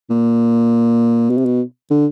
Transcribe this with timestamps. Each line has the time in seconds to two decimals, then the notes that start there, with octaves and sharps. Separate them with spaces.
0.10 A#2
1.30 B2
1.38 C3
1.45 B2
1.91 D3